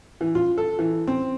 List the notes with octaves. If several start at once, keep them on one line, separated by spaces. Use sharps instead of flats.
E3
F4
A4
E3
C4